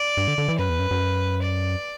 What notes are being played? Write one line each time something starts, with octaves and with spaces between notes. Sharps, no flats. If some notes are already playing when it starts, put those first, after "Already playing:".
Already playing: D5
G2
D3
D3
E3
F#2 B4
E2
F#2
F#2
D5